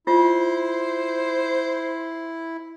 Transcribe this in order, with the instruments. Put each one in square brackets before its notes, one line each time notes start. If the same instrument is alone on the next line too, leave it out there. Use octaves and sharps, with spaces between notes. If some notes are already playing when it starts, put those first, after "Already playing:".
[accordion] E4 [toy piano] F4 [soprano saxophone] C5